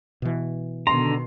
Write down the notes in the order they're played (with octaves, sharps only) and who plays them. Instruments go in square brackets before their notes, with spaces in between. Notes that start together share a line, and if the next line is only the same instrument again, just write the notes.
[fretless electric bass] B2 E3
[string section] B2 D#3 [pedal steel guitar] D3 A#5 [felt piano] C6